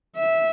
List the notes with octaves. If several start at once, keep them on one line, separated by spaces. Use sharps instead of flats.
E5